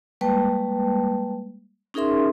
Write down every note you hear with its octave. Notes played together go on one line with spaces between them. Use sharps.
G3 G#3 A#3 B4 G5 A5
C#4 D#4 G#4 A#4 E5 C6